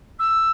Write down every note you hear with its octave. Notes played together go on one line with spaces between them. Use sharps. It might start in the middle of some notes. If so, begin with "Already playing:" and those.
E6